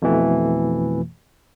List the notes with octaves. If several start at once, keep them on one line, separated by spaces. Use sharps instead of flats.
F2 B2 E3 A3